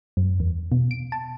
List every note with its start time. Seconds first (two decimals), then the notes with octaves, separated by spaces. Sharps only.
0.17 F#2
0.40 E2
0.72 B2
0.91 D7
1.12 A5